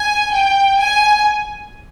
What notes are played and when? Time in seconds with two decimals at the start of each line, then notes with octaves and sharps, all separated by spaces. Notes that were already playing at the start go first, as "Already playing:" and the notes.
Already playing: G#5
0.33 G5
0.78 G#5